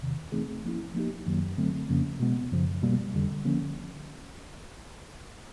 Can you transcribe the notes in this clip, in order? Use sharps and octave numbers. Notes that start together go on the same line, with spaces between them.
E2 C3 D#3
E3 A3 C4 D#4 G#4
F3 A#3 C#4 E4
F3 A#3 D#4 G4
F#2 D#3 F#3 A#3
D3 F#3 A3 C4
F2 C#3 F3 A#3 C#4
B2 G#3 B3
F#2 C#3 F3
B2 G3 A#3
F2 D3 G3
D3 F3 A#3 C#4